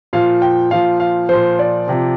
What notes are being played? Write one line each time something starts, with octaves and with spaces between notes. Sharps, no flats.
A#2 F3 F5
G5
A#2 F3 F5
F5
A#2 F3 C5
D5
C3 F3